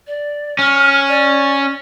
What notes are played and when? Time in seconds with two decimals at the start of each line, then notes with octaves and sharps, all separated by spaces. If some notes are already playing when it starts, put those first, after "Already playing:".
0.07 D5
0.59 C#4 F6
1.08 D5